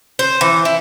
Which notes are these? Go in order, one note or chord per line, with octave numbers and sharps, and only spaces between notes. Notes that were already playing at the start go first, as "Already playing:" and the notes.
C5
E3
E4